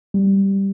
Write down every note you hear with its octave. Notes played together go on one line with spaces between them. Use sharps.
G3